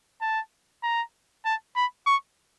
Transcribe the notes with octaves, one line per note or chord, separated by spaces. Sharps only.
A5
A#5
A5
B5
C#6